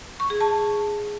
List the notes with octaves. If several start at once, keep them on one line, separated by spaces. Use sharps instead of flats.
C#6
G#4
A5